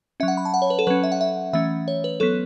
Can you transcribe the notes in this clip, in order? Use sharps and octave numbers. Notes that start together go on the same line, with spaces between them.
F#3 C#4 E5
F#5
B5
A5
F#5
C#5
B4
A4
F#3 C#4 B4
E5
F#5
E5
E3 A3 C#4 E5
C#5
B4
F#3 B3 A4